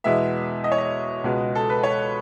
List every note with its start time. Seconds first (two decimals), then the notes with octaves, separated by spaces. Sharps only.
0.04 E2 B2 G#3 B3 E5
0.64 D#5
0.72 C#5
0.78 D#5
1.24 C#2 B2 G#3 B3
1.55 A4
1.69 B4
1.83 C#5